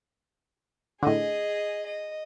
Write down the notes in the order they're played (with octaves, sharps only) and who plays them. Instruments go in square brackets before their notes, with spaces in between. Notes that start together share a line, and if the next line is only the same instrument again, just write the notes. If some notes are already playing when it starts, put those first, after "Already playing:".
[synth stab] A2 D3 [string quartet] G#4 D#5
[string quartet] D#5